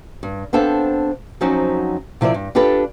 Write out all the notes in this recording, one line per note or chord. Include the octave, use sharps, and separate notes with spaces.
G2
B3 C4 D4 A4 C5 F5
F3 F#3 C4 C#4 D#4 F#4
C3 F3 E4 A#4 D5
G2
D4 F4 G4 A4 B4